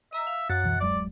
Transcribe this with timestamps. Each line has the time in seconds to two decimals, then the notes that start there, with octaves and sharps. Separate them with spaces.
0.13 D#5 E5 A#5
0.27 F5
0.49 F#2 F#5 A6
0.63 C#2 B2 E3
0.80 D1 F#3 G#3 D5